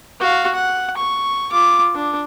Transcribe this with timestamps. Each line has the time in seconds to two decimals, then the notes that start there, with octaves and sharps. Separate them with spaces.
0.20 F#4 F5
0.54 F#5
0.97 C#6
1.52 F4 D6
1.95 D4